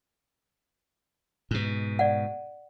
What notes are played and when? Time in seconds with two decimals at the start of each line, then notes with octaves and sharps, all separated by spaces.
1.51 G#2 B2
1.99 D5 F#5